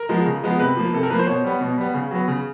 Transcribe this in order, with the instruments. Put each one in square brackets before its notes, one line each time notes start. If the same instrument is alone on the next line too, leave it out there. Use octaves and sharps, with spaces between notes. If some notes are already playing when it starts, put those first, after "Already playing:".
Already playing: [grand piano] A#4
F3 G#3 B3
C#3
F3 G#3 B3
C3 B4
F3 A#3
C3 A4
A#4
F3 A#3 B4
C5
B2 C#5
G3 B3
B2
G3 B3
C#3
F#3 B3
C#3